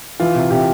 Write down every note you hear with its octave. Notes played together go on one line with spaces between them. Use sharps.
E3 F4
C3
C3 G4